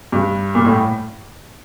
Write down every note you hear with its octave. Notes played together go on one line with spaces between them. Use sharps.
G2
A#2
A2